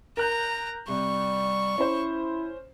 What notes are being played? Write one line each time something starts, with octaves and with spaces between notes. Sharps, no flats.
A#4 A#5 F#6 G6
C3 G3 C#6
C#4 E4 C5